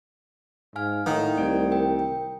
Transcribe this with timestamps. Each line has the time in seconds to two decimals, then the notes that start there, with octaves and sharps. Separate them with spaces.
0.76 G#2 F5 G#5 F6
1.06 A2 D#3 F5 F#5 D#6
1.37 C2 A3 D5 D7
1.71 A#4 G5